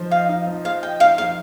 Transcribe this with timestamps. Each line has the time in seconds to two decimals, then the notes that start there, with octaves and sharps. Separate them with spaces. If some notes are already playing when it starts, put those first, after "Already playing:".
Already playing: F3 D#4 C5
0.11 D#5 F5
0.29 D#4
0.47 F3
0.64 C5 F5
0.83 D#5 G5
1.00 D#4 F5
1.18 F3 F5